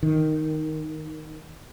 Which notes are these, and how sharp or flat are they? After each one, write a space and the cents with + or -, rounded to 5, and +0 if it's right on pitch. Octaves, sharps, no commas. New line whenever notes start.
D#3 +0